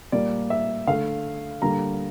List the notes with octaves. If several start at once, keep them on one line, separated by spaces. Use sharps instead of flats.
A#2 G3 A#3 D5
E5
D3 A3 F5
D3 G3 A#3 A#5